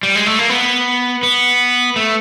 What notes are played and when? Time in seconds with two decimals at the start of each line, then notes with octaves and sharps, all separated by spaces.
0.03 G3
0.16 G#3
0.26 A3
0.39 A#3
0.49 B3
1.23 B3
1.96 A3